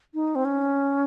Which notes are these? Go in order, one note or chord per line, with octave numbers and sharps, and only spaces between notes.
D#4
C4
C#4